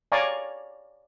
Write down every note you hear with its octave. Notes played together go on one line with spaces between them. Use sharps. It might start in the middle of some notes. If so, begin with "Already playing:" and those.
C#5 D5 F5 G#5 A#5 C#6